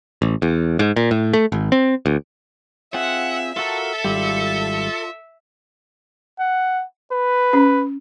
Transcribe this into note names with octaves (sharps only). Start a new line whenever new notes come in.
A1
E2
G#2
A#2
A2
A3
G#1
C4
D2
C4 F4 G#4 E5 F#5
F4 F#4 A4 A#4 E5
G#1 G3 F4 D5
F#5
B4
C#4